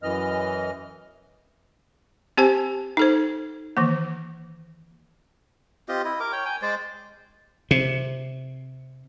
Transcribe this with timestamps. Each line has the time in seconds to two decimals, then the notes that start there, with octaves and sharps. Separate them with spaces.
0.03 F#2 E3 D#5 F6
2.37 C4 G4 C5 G#5 A5
2.97 D#4 A4 C5
3.77 D#3 E3 A#3
5.89 C4 F4 G4 D#5
6.04 E4 D#5
6.20 A#4 D6
6.32 C#5 G5
6.45 G5 G#5
6.62 G#3 C5 D5
7.71 C3